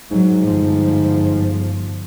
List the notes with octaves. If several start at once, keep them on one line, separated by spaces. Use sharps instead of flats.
G#2 F#3
G1 F3